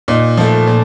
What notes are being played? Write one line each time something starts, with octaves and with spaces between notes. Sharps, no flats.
A#2 D#4
F3 A3
A#2